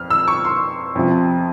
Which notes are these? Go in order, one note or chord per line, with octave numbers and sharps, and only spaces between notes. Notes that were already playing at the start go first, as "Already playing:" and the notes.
Already playing: F2 F6
E6
C#6
C6
F2 C3 F3